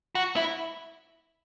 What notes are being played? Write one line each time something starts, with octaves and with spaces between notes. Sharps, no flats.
F#4
E4